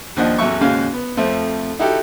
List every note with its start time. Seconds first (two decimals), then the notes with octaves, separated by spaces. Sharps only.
0.16 D#2 F3 D4 D#5 F#5
0.38 A1 E2 F#3 A3 E5 C#6
0.61 D#2 G#2 C#3 C#4 F#4 F5
0.93 B3
1.17 F2 F3 A3 C4
1.79 D#4 E4 F#4 G4 A4